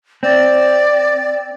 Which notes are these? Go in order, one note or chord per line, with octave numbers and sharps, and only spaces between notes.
C4 D5